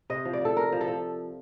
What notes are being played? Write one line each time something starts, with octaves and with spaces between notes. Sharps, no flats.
C3 D#5
F3
D5
F3 A4
C3 A#4
F3
A4
F3